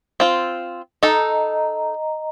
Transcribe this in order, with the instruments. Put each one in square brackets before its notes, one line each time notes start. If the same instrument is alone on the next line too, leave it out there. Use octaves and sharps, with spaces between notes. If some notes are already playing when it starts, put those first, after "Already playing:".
[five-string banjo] C4 F4
[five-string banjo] D#4 A4 [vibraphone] D#5 A#5